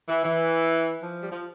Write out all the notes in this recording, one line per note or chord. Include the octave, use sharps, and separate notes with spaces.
E3
E3
F3
G3
F3